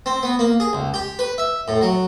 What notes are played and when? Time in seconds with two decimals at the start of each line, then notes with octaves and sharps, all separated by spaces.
0.06 C4
0.23 B3
0.39 A#3
0.60 G#4
0.73 C#2
0.94 G4
1.19 B4
1.38 E5
1.68 A2
1.81 F#3